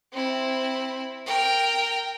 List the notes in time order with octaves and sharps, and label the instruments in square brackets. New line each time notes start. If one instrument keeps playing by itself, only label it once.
[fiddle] C4 E4
A#4 G5